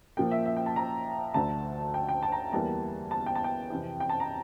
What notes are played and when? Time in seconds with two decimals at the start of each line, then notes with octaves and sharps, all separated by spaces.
0.17 A#2 F3 A#3 G5
0.31 E5
0.46 E5
0.56 G5
0.66 A5
0.76 A#5
1.34 D2 D3 A3 A5
1.94 G5
2.09 G5
2.23 A5
2.32 A#5
2.52 E2 E3 G3 A#3 A5
3.11 A5
3.26 G5
3.35 A5
3.44 G5
3.70 F2 C3 E3
4.00 G5
4.09 A5
4.20 A#5